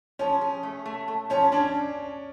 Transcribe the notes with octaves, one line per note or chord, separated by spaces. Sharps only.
F3 C#4
G#4
A3
A3
A3
F3 C#4
C#4 D4